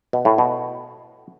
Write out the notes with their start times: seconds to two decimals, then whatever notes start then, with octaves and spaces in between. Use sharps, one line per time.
0.13 B2
0.25 A2
0.38 B2